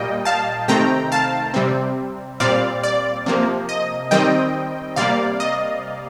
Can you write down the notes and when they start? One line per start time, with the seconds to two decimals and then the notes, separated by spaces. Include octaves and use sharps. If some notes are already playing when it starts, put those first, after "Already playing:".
Already playing: A#2 G3 A#3 D#5 G5
0.25 F5 A5
0.68 C3 D#3 A3 C4 G5 A#5
1.12 F5 A5
1.54 C3 G3 C4
2.40 A#2 G3 C4 D5 F5
2.83 D5
3.26 C3 F3 A#3
3.69 D#5
4.11 D#3 G3 C4 D#5 G5
4.96 C3 G3 A#3 D5 F5
5.40 D#5